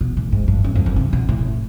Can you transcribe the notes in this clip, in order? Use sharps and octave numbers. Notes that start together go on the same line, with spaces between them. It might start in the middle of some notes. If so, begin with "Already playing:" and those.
B2
A2
G#2
G2
F#2
F2
F#2
C3
B2
A2